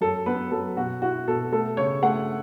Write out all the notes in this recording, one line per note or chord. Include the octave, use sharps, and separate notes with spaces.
F#2 A4
B3 B4
F#3 A4
B2 F#4
E4 F#4
B2 A4
A3 A4
C#3 C#5
A3 F#5